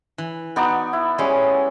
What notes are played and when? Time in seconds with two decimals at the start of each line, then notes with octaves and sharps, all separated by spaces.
0.18 E3
0.56 B3 D#4 F#4 D5
0.93 E4
1.18 G3 G#3 C#4